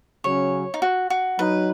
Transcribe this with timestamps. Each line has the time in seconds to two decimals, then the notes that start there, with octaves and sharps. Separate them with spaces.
0.24 C#3 F#3 C#4 C#5
0.74 D#4
0.82 F#4
1.10 F#4
1.38 F#3 D#4 B4